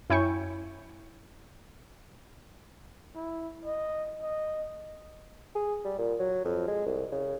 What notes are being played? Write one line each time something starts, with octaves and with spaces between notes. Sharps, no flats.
F#2 E4 C#5 G5 G#5 C#6
E4
D#5
D#5
G#4
G3
A#2
F#3
F2
G#3
C2
C#3